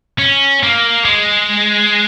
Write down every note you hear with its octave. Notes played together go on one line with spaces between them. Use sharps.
C#4
A#3
G#3